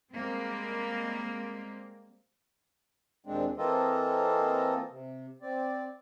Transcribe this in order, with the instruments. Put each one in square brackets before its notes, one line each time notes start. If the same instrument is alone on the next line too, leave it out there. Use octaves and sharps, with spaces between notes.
[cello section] G3 G#3 A#3 C4
[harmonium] D#2 A#2 G#3 C4 D4
E3 A#3 C4 F4 A4 D#5
C3
C4 D5